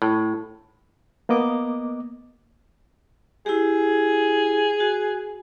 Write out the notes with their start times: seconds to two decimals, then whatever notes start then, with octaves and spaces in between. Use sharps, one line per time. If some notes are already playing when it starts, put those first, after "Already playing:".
0.02 A2
1.29 A#3 B3 D#5 D6
3.46 E4 G4 G#4
4.80 F#4